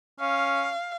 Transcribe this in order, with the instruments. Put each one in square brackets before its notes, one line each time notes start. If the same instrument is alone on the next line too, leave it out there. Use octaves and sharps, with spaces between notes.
[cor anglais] C#4 [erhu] F5